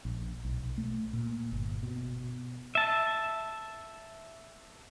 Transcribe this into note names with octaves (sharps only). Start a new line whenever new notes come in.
A#1
B1
A3
A#2
G1
B2
E5 A5